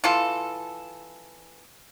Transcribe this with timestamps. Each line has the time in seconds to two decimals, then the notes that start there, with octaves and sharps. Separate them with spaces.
0.04 E3 F4 A4